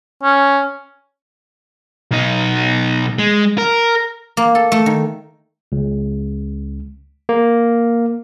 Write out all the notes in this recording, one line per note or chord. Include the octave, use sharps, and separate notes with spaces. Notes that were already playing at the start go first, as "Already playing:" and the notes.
C#4
B1 D#4
G#3
A#4
A#3
A4
A3
D#3
C#2
A#3